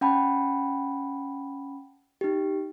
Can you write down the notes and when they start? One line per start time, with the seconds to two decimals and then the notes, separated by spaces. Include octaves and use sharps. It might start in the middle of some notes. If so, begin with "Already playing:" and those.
0.01 C#4 F#5 G5 A5 B5
2.21 D#4 G4